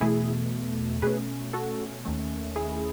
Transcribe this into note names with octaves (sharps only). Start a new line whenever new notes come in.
E2 B2 A3 E4 G#4
B2 A3 C#4 G#4 B4
F#4 A4
D#2 D#3 A3 C#4
E4 G#4